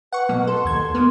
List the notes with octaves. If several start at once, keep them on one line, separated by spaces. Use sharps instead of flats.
B4 F#5 C#6
B2 F#3 A#3
A4 C6
D#2 G#6
A#3 B3